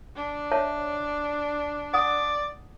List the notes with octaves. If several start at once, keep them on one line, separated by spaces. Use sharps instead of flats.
D4
C#5 E5 A5
D5 F#5 D#6